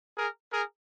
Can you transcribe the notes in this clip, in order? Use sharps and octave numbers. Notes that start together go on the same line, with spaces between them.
G#4 A#4
G#4 A#4